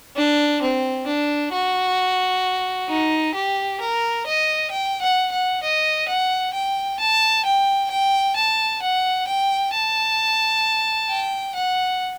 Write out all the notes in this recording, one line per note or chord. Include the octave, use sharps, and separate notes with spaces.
D4
C4
D4
F#4
D#4
G4
A#4
D#5
G5
F#5
F#5
D#5
F#5
G5
A5
G5
G5
A5
F#5
G5
A5
G5
F#5